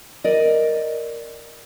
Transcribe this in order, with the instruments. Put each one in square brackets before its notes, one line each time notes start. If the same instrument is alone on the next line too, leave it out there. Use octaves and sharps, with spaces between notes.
[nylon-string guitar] A#4 D5 D#5